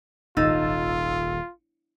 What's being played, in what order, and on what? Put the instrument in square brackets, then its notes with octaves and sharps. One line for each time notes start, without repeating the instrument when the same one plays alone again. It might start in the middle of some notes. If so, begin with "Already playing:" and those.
[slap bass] D#1 [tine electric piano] G#1 E6 A6 [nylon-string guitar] D#4 [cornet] F4